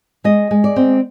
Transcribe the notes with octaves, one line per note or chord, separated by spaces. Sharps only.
G#3 D#5
G#3
D5
C4